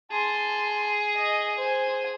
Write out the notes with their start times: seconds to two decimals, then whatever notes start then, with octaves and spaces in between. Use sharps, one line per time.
0.11 G#4 A5 C6
1.16 D#5
1.58 C5 G#5